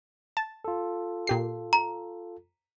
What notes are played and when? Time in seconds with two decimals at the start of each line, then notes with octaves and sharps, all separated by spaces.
0.37 A5
0.65 F4 A4
1.27 A#2 G4 C7
1.73 A#5